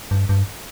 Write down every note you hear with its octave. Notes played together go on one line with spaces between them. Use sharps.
G2
G2